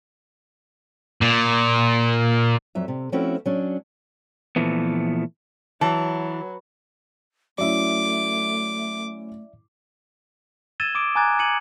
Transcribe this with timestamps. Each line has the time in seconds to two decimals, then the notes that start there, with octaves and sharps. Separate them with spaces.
1.21 A#2
2.75 F2 F#3 E5
2.88 C3
3.12 F3 A3 C4 C#4 E4 F#4
3.46 F#3 C#4 D4
4.56 A#2 E3 F3 A3 B3
5.81 E3 F#3 A5
7.58 F#3 A3 C#4 E4 D5 E5 D6
10.80 E6 G#6 A6 D#7 E7 G7
10.95 D6 D#6 D7
11.15 G#5 A#5 D6 F#6 G#6 A6
11.39 G#6 C#7 D#7 F#7